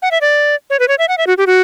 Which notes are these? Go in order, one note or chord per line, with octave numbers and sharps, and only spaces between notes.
F#5
E5
D5
C#5
B4
C#5
E5
F#5
E5
F#4
G4
F#4